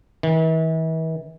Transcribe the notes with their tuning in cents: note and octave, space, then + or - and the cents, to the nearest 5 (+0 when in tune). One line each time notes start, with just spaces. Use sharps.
E3 -40